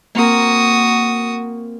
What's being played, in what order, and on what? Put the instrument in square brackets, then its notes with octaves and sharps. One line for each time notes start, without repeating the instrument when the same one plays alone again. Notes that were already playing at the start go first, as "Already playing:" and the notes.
[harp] A#3 C4 A#4 [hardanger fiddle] F#4 D#6